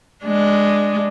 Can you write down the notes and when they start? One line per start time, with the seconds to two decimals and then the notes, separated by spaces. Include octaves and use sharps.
0.24 G#3 D4